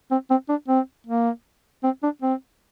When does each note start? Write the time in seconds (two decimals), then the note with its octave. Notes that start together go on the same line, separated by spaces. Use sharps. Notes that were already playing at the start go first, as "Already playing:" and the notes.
0.11 C4
0.30 C4
0.49 D4
0.68 C4
1.07 A#3
1.84 C4
2.03 D4
2.22 C4